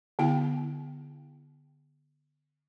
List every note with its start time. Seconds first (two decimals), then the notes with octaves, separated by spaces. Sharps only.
0.19 D3 B3 E4 G5